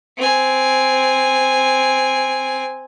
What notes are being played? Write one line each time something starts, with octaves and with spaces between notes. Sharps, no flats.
C4 G#5